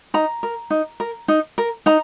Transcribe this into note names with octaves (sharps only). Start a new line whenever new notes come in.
D#4 A#5
A#4
D#4
A#4
D#4
A#4
D#4 A#5